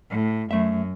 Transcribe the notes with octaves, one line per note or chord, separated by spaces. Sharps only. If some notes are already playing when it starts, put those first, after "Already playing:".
A2
F#2 A3 E5